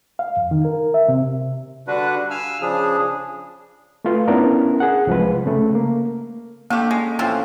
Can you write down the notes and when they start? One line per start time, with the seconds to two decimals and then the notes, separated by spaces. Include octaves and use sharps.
0.19 F5
0.37 F2
0.51 D#3
0.65 A#4
0.94 E5
1.08 C3
1.87 D3 G3 D4 F#4 B4
2.31 F5 G#5 E6 F6
2.62 C#3 F3 D4 G#4
4.05 A3 F4 B4
4.28 B3 C#4 D4 E4 A#4
4.80 G#4 F#5
5.07 C2 F3 G#3 B4
5.46 C#3 A3
5.75 A#3
6.70 D3 A3 A#3 G4
6.91 G#3 C#4
7.19 A2 E3 F3 C4 C#4